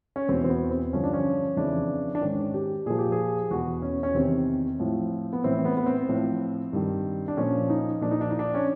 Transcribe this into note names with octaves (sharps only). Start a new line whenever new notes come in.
C#4
E2 B2 C4
C4
B3
C4
G2 D3 F3 C#4
D4
C#4
F2 C#3 E3 D4
D4
G#2 D#3 C#4
G4
A#2 F3 G#4
G4
G#4
E2 B2 F#4
C#4
C#4
E2 C3 D#3 C4
A2 F3
B3
A2 E3 C4
B3
B3
C4
A2 F3
G2 D#3
D4
A#2 F3 C#4
D#4
A#2 F3 D4
D#4
D4
D#4
D4
C#4